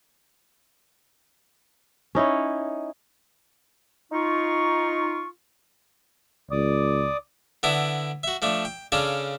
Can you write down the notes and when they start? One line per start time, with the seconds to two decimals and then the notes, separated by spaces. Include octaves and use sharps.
2.15 C#4 D#4 E4 C#5
4.12 D#4 F4 C#6
6.51 C#2 D5 D6 D#6
7.63 D3 B3 D4 E4
8.23 F#4 E5
8.42 F3 A3 D4
8.65 G5
8.92 C#3 C#4 D4 F4 A4